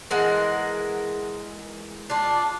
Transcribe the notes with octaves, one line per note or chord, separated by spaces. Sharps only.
E3 G#3 A#4 F#5
D4 F4